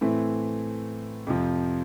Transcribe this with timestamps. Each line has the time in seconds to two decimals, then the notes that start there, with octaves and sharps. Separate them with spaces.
0.01 A2 E3 A3 C4
1.27 F2 C3 F3